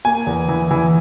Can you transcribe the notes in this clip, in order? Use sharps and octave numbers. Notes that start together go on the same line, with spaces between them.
A#3 G#5
E2
E3
E3